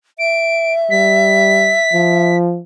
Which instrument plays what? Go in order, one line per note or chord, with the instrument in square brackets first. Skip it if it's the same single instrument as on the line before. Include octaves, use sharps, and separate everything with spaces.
[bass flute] E5 [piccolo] D7
[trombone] G3 [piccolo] B6
[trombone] F3